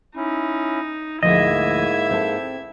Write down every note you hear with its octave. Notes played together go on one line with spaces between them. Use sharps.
C#4 D#4 E4
D2 G#2 F3 A#3 E4 D#5 E5 G#6
C4 A4